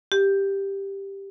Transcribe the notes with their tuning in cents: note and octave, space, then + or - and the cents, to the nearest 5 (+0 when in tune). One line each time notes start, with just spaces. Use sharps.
G4 +5